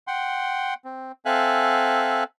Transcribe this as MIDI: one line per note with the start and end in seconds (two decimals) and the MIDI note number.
0.07 0.74 78
0.07 0.74 79
0.07 0.74 84
0.85 1.12 60
1.25 2.24 60
1.25 2.24 69
1.25 2.24 76
1.25 2.24 77
1.25 2.24 80
1.25 2.24 90